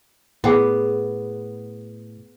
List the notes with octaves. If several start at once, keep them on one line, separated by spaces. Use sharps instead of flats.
A2 B3 G#4 F#5 B5